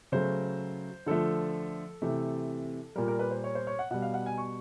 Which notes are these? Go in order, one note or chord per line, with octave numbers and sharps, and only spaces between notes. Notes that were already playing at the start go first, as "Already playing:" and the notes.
C#3 F#3 A3 C5
D3 F3 A3 A4
C3 E3 A3
A#2 G3 A#4
A#4
B4
C5
C#5
C5
C#5
F#5
B2 G3 F#5
F5
F#5
G#5
C#6